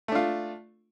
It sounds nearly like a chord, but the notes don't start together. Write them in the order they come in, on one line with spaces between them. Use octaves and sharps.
A3 D4 F4